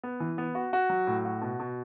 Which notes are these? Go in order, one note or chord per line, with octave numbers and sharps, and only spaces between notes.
B3
E3
B3
F#4
F#4
F#3
A2
F#4
B2
B2